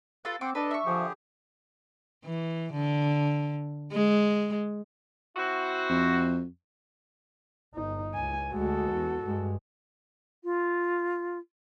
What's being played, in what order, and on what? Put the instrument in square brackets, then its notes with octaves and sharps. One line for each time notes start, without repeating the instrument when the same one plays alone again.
[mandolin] F4 A4 [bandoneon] B4
[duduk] C4 [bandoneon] F#5 G5 C6 [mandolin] D6
[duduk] D4 [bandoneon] A4 D#5 [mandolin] B4
[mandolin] E5 C#6
[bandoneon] D3 G4 G#4 [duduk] F3
[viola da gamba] E3
D3
G#3
[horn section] C4 E4 F#4
[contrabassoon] F2
[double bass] G1 D#4
[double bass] C#2 [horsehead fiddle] G#5
[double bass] D2 G#3 [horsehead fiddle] F#4 A4
[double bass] E2
G2 G#3
[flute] F4